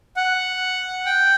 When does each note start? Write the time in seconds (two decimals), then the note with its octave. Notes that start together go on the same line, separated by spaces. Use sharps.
0.16 F#5
1.06 G5